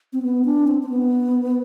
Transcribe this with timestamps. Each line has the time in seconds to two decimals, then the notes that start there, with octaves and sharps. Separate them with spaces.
0.13 C4
0.23 B3
0.45 D4
0.67 C4
0.83 C4
0.89 B3